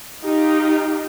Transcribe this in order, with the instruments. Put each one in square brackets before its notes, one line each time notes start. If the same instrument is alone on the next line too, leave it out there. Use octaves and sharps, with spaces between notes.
[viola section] D#4 F4 G4